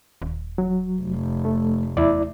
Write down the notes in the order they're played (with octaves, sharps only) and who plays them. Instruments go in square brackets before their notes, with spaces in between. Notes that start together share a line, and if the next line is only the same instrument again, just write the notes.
[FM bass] D#1
[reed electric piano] F#3
[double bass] F1
[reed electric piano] A3
[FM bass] E2 [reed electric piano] E4 D5